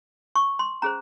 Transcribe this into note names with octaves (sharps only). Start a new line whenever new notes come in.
C#6
C6
C#4 G#4 C5 A#5